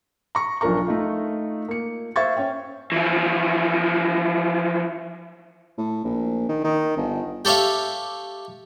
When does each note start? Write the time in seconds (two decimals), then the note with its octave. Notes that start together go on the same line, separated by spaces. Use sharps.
0.35 A#5 C#6
0.61 B1 F3 D4 A#4 A#5 C#6
0.87 A3 D#4 F4
1.68 A#3 C#7
2.16 C5 E5 F5 C#6 G#6 A6
2.37 C#4 C#5 G5
2.92 E3 F3
5.78 A2
6.04 A#1
6.49 D#3
6.64 D#3
6.97 G1
7.45 G4 A4 C#5 E5 F5